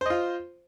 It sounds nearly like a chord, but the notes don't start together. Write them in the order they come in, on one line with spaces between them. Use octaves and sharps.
C5 D#5 F4